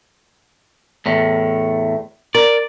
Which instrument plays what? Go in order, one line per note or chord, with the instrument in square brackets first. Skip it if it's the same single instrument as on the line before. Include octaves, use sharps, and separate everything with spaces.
[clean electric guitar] E2 A2
[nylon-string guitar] A#4 [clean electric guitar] D5